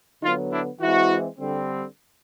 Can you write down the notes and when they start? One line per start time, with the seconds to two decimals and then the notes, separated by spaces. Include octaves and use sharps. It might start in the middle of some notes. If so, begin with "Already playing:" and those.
0.22 D3 F#3 B3 D#4 F4
0.51 D4 E4
0.80 E3 G#3 C4 E4 F#4
1.39 D3 G3 C4